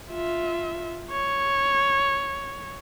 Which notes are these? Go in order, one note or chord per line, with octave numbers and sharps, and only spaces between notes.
F4 E5
C#5